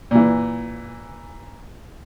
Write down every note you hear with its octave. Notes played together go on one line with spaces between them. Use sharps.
A#2 E3